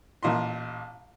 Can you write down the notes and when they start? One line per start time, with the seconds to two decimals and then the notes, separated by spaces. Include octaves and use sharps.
0.23 A1 A#2 D#5 C6